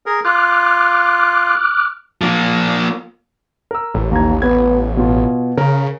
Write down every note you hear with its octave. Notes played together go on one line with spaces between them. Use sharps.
G#4 A#4
F4 D6 F6 F#6
F3 A#3
A#4 E6
A1
D#2 A#5 G#6
B3 B4 G#6
B2 F4
C#3 A#4